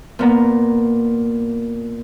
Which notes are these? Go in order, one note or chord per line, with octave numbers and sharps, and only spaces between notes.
A#2 B3 A#5